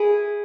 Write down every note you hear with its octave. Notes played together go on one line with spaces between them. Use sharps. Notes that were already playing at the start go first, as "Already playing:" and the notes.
Already playing: E4 G#4